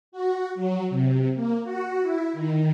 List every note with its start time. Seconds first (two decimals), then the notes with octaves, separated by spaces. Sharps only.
0.12 F#4
0.55 F#3
0.90 C3
1.35 A#3
1.64 F#4
2.02 E4
2.33 D#3